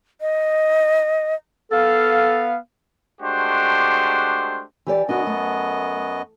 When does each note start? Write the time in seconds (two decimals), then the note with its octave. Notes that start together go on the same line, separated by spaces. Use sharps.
0.21 D#5
1.71 B3 A4 F5
3.21 G#3 A3 D4 F#4 G4 C5
4.86 E3 G4 D5
5.09 F#2 B3 D4 F#4 D#5
5.27 A3